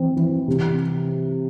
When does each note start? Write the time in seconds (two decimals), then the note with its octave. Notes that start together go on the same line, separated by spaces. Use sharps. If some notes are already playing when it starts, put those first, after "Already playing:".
Already playing: E3 C4
0.16 E3
0.48 C3